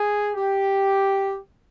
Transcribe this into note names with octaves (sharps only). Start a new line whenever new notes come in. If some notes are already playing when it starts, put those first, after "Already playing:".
Already playing: G#4
G4